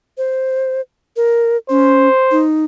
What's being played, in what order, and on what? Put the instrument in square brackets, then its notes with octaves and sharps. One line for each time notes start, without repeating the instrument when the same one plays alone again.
[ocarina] C5
A#4
[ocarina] C#4 [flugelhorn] C5
[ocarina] D#4